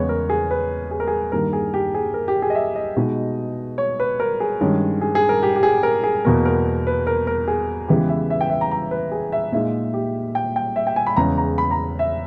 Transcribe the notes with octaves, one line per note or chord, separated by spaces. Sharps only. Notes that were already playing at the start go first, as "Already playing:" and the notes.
Already playing: E2 C#3 G#3 B3 C#5
A#4
G#4
B4
G#4
A#4
G#4
G2 D#3 G3 A#3 A#4
G#4
G4
G#4
A#4
G4
G#4
D#5
E5
D#5
B2 G#3 D#4
C#5
B4
A#4
G#4
G2 D#3 G#3 C#4
G#4
G#4
A#4
G4
G4
G#4
A#4
G#4
E2 B2 A#3 A#4
A#4
B4
A#4
A#4
G#4
C#3 E3 G#3 B3 G4
E5
E5
G5
E5
A#5
A#5
B4
G#4
E5
A#2 G#3 D#4 E5
G4
G5
G5
E5
G5
G#5
B5
E2 C#3 G#3 C#4 A#5
A#5
B5
A#5
E5